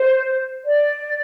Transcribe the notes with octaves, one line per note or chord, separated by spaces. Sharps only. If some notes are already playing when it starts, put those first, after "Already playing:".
Already playing: C5
D5